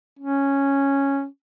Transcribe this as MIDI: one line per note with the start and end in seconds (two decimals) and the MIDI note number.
0.19 1.26 61